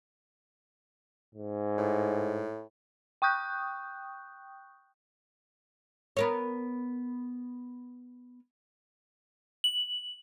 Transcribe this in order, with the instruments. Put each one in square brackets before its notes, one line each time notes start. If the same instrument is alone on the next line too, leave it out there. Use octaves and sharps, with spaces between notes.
[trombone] G#2
[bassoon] A2
[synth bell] G5 C#6 D#6 F#6 G6
[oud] B3 A#4 C#5
[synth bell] F#7